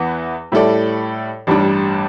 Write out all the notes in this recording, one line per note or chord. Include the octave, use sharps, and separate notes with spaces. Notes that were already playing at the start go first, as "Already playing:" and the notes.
Already playing: E2 E3 B3
A2 G3 E4 A4 D5
A1 G2 G3 D4